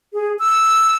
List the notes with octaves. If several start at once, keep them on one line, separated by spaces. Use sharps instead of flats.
G#4
E6